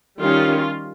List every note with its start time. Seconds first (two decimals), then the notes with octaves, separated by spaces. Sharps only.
0.19 D#3 G3 C#4 F4